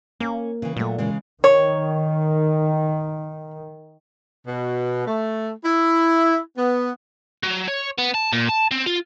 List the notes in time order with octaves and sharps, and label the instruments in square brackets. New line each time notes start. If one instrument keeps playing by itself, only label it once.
[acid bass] A#3 [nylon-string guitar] C#4
[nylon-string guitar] C#3 E3
[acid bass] A#2 [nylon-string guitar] F#3 A3
[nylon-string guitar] C#3 E3 G#3
[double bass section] D#3 [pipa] C#5
[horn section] B2
A3
E4
B3
[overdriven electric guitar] F#3
C#5
B3
A5
A#2
A5
C4
F4